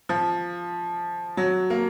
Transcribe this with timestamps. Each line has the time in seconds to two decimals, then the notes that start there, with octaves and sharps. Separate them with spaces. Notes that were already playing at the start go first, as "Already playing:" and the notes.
0.09 F3
1.37 F#3
1.70 A#3